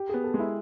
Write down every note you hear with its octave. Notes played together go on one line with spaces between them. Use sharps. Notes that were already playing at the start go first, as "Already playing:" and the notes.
Already playing: G4
B3 G#4
A4
G#3
E4